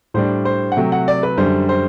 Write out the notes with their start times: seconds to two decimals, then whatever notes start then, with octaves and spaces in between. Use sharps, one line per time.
0.14 A2 G3 D4 C5
0.45 C5
0.72 F#5
0.76 C3 F#3 A3 G5
0.92 F#5
1.08 D5
1.23 B4
1.37 F#2 D3 G3 C5
1.69 C5